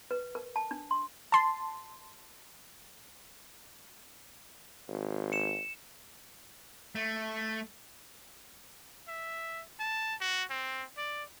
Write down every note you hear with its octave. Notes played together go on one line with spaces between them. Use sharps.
B4
A#4
A5
D4
C6
A5 C6
G#1
C#7 E7
A3
E5
A5
F#4
C4
D5